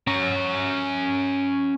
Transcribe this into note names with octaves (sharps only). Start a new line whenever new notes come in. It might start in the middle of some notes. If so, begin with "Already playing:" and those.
C#4 A#5